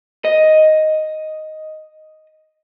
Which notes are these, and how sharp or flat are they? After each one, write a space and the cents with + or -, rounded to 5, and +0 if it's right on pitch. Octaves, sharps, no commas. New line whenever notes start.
D#5 +0